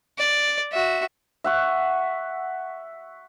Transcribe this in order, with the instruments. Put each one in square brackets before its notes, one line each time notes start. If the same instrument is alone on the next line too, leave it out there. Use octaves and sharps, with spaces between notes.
[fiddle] D5
F#4 E5
[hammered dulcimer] E5 F#5 C#6